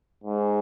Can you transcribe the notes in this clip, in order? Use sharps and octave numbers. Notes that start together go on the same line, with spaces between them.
G#2